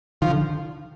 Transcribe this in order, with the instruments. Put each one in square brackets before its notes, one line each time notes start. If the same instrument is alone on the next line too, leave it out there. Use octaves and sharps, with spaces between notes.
[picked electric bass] D#3 [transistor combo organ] F3
[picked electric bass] D3